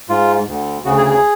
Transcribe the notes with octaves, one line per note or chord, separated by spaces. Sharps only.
G#2 F4
D2 D3
D2 C#3 F#4
G#4
G#4